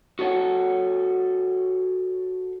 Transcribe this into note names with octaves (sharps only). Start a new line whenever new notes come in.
F#4 G#4 A4 C#5 F#5